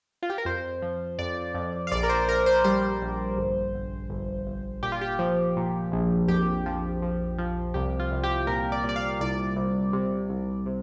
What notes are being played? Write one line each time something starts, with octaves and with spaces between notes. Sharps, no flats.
F4
G4
A#4
F2 C5
F3
F2 D5
F2
F5
A#1 D5
A#4
C5
A#1 A#4
C5
G3 C5
A#1
G1
G1
G1
G1
A#2 G4
F4
G4
F3
A#2
A#1
F2 G4
F3
F3
F3
C2 G4
F4
C2
G4
A#2 A#4
D5
A#2
D5
F5
C2 D5
C2
C3
C2
C3